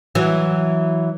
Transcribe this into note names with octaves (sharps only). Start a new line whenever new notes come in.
E3 F#3